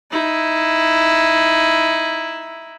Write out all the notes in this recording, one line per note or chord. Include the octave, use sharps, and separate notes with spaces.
D#4 E4